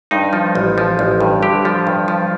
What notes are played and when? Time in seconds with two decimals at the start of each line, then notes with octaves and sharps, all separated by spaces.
0.11 G2 D#4
0.33 F3
0.55 A1
0.78 F3
0.99 A1
1.20 G2
1.42 D3 G4
1.65 F3
1.87 G2
2.08 F3